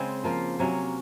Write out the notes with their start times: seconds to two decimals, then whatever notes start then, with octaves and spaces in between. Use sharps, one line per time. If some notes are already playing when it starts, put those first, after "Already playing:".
Already playing: C#3 G#3 C4
0.24 F3 A#3 F4
0.59 C3 F#3 A#3 C#4